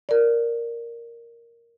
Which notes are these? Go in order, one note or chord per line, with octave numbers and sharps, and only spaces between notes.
A#4 D5